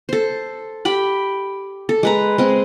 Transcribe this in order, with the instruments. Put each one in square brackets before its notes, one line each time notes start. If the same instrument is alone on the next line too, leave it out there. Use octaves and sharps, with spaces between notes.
[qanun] A4 C5
G4 G5 B5
A4
G#3 B4 A#5
G#3 C4